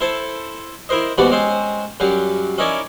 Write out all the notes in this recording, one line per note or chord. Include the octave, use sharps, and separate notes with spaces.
E4 A4 C5
E4 A#4 C5 D#5
D#2 G#2 G3 B3 F#4 D5
G#3 C4 C#4 C5
F#2 F#3 G3 G4 F5
C#4 D#4 E4 A#4 C#5 D5